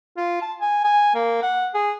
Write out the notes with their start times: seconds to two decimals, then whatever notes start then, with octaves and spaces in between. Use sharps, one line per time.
0.17 F4
0.42 A5
0.61 G#5
0.84 G#5
1.15 A#3
1.43 F#5
1.75 G#4